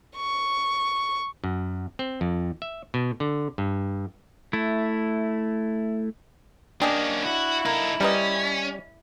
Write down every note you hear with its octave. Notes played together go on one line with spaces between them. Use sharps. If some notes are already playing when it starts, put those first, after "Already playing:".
C#6
F#2
C4
F2
E5
B2
D3
G2
A3 E4
A#3 C#4 D4 G4 G#4 D#5
E4 F#4
A#3 D#4 A4
G3 C#4 A#4 B4 D#5